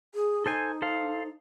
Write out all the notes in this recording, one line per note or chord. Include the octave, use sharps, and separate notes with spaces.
G#4
D#4 A4 C5 G#5
A4 C5 F5